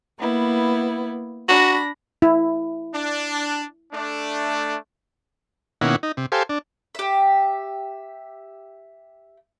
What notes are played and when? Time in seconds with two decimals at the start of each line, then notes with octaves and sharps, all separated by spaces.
0.18 A#3 B3 E4
1.49 D4 F#4 B5 A#6
2.22 E4
2.94 D4
3.93 A3 D4
5.81 B2 D#3 A#3 C#4 E4 F#5
6.03 D#4
6.17 C3
6.32 G4 A4 C5 F5 G#5
6.49 D4
6.95 G4 E5